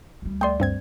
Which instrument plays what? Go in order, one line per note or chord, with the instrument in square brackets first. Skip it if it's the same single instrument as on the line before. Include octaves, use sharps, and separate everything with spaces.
[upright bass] D2 G3
[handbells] A3 D5 [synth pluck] G5 C6
[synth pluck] G2 C4 G#6